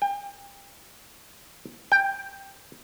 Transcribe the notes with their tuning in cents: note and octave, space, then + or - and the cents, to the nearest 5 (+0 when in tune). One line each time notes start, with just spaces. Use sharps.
G5 +30
G5 +5